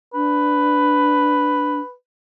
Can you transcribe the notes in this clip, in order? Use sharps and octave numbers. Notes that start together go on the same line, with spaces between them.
D4 B4